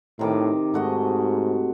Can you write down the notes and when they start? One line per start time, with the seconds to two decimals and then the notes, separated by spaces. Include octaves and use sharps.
0.19 A2 C3 D#3 D6
0.74 G#2 A3 F#4 D#5